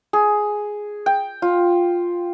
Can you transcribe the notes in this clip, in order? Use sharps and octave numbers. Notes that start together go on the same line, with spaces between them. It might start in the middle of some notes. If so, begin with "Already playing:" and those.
G#4
G5
F4